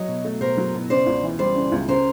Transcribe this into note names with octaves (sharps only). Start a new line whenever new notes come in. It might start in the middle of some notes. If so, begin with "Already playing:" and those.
Already playing: F#3 C#5 D#5
B2
A3
B2 A#4 C5
F#3
B2
C#3 C5 D5
C#2
E3
G3 C5 D5
C#3
C#2
C#3 A#4 C5